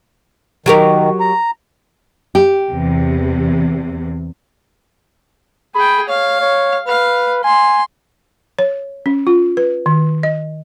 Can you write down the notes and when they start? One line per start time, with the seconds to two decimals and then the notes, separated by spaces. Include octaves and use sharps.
0.66 D#3 F#3 G4 A#4
1.20 A#5
2.35 G4
2.68 E2 C3
5.75 G#4 G5 B5
6.09 C#5 F5
6.41 C#5
6.88 B4 F5
7.44 G#5 C6
8.59 C#5
9.06 C#4
9.27 F4
9.57 B4
9.86 D#3
10.23 D#5